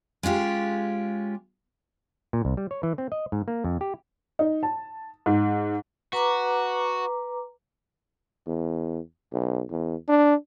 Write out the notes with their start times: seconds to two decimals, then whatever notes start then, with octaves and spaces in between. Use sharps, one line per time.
0.23 G#3 C#4 F4 G4
2.33 A#2
2.45 C2
2.57 G3
2.71 C#5
2.83 E3
2.98 C4
3.12 D#5
3.32 G#2
3.48 A#3
3.64 F2
3.81 G4
4.39 D#4
4.63 A5
5.26 G#2
6.13 F#4 B4 A#5 D6
8.47 E2
9.33 B1
9.71 E2
10.09 D4